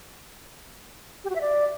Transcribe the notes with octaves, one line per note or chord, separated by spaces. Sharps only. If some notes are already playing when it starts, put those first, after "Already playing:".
G4
F#4
E5
D5